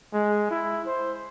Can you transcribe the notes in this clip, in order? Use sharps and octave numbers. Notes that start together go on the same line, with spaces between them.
G#3
E4
C5